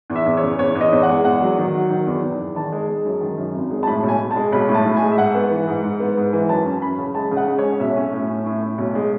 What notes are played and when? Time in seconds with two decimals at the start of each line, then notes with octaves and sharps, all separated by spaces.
0.10 E2
0.16 E5
0.26 E2
0.37 C#5
0.42 C#3
0.59 E2 C#5
0.75 E2
0.81 D#5
0.92 E2
1.03 F#5
1.08 G#3
1.25 E2 F#5
1.41 F#3
1.58 D#3
1.74 F#3
1.90 D#3
2.07 E2
2.23 E2
2.40 E2
2.56 D#3 A5
2.72 G#3
2.89 G#3
3.05 F#2
3.21 D#3
3.37 F#2
3.54 G#1
3.70 G#3
3.83 A5
3.87 A2 B5
4.03 B1
4.08 G#5
4.20 B1
4.31 A5
4.36 G#3
4.52 B1 B5
4.69 A2
4.74 A5
4.85 A2
4.96 G#5
5.02 G#3
5.12 E5
5.18 G#2 F#5
5.34 B3
5.50 E3
5.67 G#2
5.83 G#2
6.00 B3
6.17 G#2
6.33 E3
6.49 F#2 A5
6.66 C#4
6.82 C#4 B5
6.98 C#3
7.15 G#3 A5
7.31 C#3
7.37 F#5
7.47 G#3
7.58 C#5
7.64 C#4
7.80 B1 E5
7.96 C#4
8.13 A2
8.30 C#4
8.46 A2
8.62 A2
8.78 B1
8.95 G#3